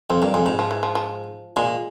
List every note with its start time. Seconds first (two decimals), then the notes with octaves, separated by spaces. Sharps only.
0.10 F2 C4
0.22 G2 A#3
0.34 F2 G#3
0.46 G#2 G3
0.59 F3
0.71 E3
0.83 F3
0.95 F3
1.56 A#2 G#3